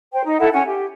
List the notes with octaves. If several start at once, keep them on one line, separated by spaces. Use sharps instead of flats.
C5 G5
D#4
E4 A4 F#5
C#4 F#5 G#5
G4